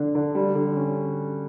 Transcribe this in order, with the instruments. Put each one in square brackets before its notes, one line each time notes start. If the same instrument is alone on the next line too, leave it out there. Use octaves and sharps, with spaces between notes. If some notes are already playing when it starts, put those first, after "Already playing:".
Already playing: [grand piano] D3 D4
D3
G3
D3
C#4